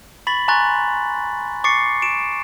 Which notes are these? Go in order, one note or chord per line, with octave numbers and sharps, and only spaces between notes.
B5 C#6 A6 B6 F#7
G#5 A#5 C6 C#6 F#6 A6
C#6 D6 A6 C7 C#7
D7 E7